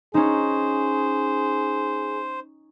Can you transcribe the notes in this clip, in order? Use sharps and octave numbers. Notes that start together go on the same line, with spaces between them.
C#4 D#4 G#4 C5